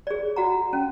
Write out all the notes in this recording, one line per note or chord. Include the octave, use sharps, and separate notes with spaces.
G#4 D5
F#4 F#5 A#5
C#4